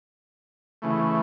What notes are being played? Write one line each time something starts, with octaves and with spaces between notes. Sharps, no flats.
C#3 E3 A3